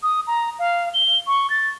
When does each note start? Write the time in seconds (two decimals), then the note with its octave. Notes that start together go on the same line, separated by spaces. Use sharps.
0.03 D#6
0.27 A#5
0.59 F5
0.94 G7
1.27 C#6
1.50 A6